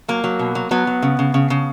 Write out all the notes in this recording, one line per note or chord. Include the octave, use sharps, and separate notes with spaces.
F#3 A#3
F#3
B2
F#3
F#3 B3
F#3
C#3
C#3
C#3
C#3